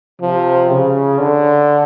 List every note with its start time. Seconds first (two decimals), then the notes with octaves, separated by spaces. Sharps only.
0.22 C3 F3
0.71 C#3
1.19 D3